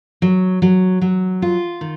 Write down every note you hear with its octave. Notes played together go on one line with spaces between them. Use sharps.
F#3
F#3
F#3
F4
D#3